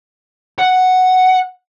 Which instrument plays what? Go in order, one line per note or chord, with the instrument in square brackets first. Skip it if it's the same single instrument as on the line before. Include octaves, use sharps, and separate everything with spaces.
[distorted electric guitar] F#5